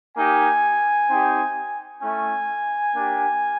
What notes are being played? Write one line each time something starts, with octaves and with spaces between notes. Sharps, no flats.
A#3 D#4 G4 G#5
C4 D#4 G4
A3 C#4 E4 G#5
A#3 D4 G4